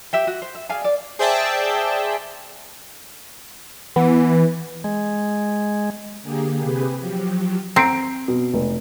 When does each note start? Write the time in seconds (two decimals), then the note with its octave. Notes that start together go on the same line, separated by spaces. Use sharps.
0.13 G4 E5 G5
0.27 F#4
0.42 C5
0.55 E5
0.69 G#4 D5 F5 G#5
0.84 D5
1.19 G#4 C5 D5 E5 G5 A5
3.96 E3 B3
4.84 G#3
6.23 D3 A#3 G4 G#4
6.61 C3 G4 G#4 B4
6.98 F3 F#3 G4
7.76 C4 A#5 C7 D7
8.28 B2
8.54 F1